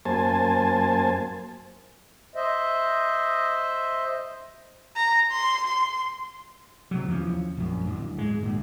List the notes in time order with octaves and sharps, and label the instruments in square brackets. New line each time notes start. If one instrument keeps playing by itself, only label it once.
[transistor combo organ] F#2 A#3 C5 G#5 A5
[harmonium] C5 D#5 E5
[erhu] A#5
C6
C6
[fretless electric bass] C3 F#3
D#2 E3 F3 C#4
A#1 F#2
D1
G#2 G#3
D2 A#2